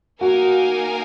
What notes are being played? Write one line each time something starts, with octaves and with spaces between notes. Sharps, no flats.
A#3 D#4 F#4 A#4 F5 G#5